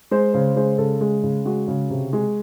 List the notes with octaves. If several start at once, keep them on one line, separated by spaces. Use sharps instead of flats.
G#3 C5
C#3 C5
G#3 C5
C#3 A4
G#3 G#4
C#3
G#3 F#4
C#3
C3
G#3